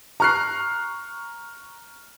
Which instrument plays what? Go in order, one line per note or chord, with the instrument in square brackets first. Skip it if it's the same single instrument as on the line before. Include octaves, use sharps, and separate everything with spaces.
[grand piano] A#5 C#6 F6 F#6 C7